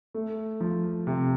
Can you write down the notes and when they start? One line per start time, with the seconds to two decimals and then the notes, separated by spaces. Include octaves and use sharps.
0.14 A3
0.61 F3
1.07 C3